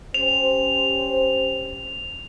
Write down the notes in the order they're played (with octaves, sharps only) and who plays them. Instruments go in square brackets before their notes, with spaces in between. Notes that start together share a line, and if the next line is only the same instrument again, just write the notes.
[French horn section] C#4 G4 C5 [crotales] F7